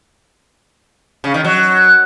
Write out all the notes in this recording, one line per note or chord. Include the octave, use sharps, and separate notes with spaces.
C#3
D#3
F#3